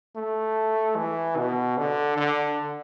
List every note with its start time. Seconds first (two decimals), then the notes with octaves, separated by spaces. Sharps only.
0.16 A3
0.96 E3
1.37 B2
1.78 D3
2.17 D3